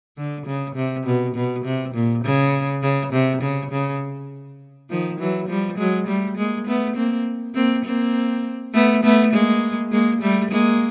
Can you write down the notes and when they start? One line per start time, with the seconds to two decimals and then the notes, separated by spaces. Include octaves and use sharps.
0.17 D3
0.46 C#3
0.75 C3
1.06 B2
1.35 B2
1.65 C3
1.94 A#2
2.24 C#3
2.82 C#3
3.13 C3
3.42 C#3
3.71 C#3
4.90 D#3 F3
5.19 E3 F#3
5.48 F3 G3
5.78 F#3 G#3
6.07 G3 A3
6.37 G#3 A#3
6.67 A3 B3
6.96 A#3 C4
7.55 A#3 C4
7.85 A#3 C4
8.74 A3 B3
9.03 A3 B3
9.33 G#3 A#3
9.92 G#3 A#3
10.21 G3 A3
10.50 G#3 A#3